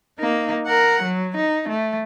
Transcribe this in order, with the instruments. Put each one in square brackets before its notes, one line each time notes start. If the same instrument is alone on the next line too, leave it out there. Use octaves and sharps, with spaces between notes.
[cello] A#3 D#4
A#4 F#5
F#3
D#4
A3